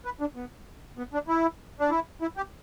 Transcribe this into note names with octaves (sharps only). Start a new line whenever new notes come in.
B4
D4
B3
B3
D4
E4
D4
E4
E4
G4